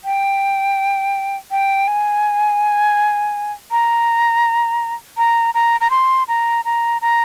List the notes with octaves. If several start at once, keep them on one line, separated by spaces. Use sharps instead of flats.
G5
G5
G#5
A#5
A#5
A#5
A#5
C6
A#5
A#5
A#5